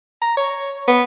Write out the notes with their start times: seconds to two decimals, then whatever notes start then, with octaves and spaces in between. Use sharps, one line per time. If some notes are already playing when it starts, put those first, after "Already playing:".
0.21 A#5
0.37 C#5
0.88 B3